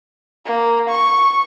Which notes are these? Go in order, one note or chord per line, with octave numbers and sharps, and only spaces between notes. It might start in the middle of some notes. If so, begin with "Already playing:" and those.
A#3
C#6